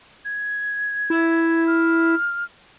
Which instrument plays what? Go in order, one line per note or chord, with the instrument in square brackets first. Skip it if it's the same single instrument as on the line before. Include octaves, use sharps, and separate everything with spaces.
[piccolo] G#6
[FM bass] E4
[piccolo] F6